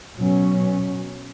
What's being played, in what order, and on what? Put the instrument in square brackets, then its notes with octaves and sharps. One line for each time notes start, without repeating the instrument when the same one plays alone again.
[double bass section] B2 F#3 C#4